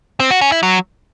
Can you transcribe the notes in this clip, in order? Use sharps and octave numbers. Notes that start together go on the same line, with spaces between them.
C4
F#4
C#4
E4
F#3